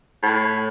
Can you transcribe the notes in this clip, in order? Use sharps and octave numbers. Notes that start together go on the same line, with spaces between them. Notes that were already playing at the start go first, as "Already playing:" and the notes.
A2